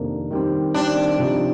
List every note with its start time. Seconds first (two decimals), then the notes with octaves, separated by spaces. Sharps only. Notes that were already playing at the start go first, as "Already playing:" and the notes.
Already playing: F2 C3 D#3 A#3 D4
0.31 D#3 G3 C4
0.74 D#3 G3 C4 D4
1.19 C3 F3 C4 D#4